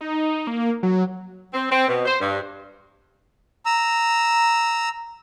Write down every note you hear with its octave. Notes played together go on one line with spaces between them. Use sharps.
D#4
A#3
F#3
C4
C4
B2
C5
G2
A#5 E6